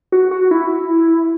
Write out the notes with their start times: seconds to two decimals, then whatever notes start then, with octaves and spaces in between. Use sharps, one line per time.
0.12 F#4
0.31 F#4
0.51 E4